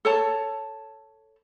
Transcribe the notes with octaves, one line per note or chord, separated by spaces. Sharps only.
A4 C#5 A5